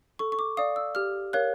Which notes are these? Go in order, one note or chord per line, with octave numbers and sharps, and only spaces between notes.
A4 C#6
C#6
D6
D5 F5 D#6
E6
G4 F6
A#4 C#5 F5 F#6